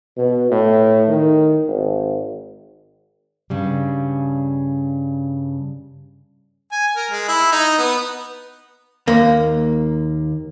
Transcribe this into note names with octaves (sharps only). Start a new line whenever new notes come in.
B2
A2
D#3
G#1
G2 C#3 G3
G#5
A#4
G#3
E4
D#4
B3
D#2 A#3